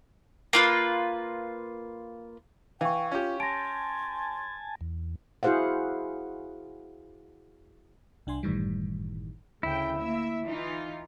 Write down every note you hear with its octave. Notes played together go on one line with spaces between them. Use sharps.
A#3 F4 B4
E3 F5 G5 C#6
C#4 F4 G4
G#5 A5 C6 A#6 D7
E2
E4 F#4 G#4 C5 F5 F#5
C2 D4 G#5 C6
G1 F#2 A2 D#3 E3 G3
D2 C#3 E4 G5
A#3 E5
E3 D#4 F4